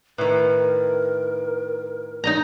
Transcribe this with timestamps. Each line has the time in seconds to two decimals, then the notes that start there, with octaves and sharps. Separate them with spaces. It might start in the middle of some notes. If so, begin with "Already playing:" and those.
0.18 A2 D#3 A#4 B4 F#6
2.24 D#4 D#5 A#5